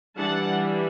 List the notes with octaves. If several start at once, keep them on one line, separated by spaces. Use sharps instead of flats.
E3 G3 D4 F#5 A5